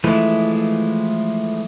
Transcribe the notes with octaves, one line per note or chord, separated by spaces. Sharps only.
E3 F3 G#3 A3 E4